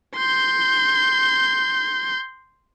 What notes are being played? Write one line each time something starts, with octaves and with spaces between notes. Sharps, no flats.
C6 G6